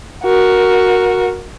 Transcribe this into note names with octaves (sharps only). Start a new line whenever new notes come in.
F#4 A#4